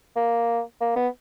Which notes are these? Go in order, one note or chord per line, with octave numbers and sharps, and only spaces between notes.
A#3
A#3
B3